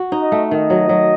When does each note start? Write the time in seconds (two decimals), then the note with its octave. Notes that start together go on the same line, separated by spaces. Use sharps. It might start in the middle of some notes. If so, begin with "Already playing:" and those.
Already playing: F#4
0.12 D#4
0.22 D#5
0.32 A3
0.51 D#3 D#5
0.70 F#3
0.89 F#3